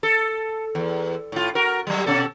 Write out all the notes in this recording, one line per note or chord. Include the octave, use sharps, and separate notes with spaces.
A4
E2
A2 F4
F#4 A#4
F#3 G3
B2 C#4 A4